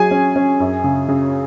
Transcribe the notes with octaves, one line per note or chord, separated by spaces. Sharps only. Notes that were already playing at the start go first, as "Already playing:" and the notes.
Already playing: F#3 G#4 G#5
C#4
C#4
F#2
C#3
C#3